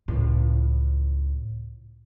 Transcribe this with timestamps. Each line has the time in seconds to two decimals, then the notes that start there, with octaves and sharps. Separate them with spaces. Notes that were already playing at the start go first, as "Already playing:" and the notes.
0.08 C#2 A2